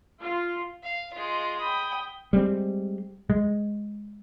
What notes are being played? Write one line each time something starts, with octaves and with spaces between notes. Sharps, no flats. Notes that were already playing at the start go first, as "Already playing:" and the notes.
F4
F5
G#3 F4
G5 B5 D#6
G3 G#3 C4
G#3